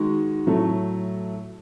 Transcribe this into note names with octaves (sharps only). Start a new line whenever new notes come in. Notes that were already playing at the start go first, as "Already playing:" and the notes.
Already playing: D#3 G#3 D#4 F#4
A2 F#3 A3 E4 A4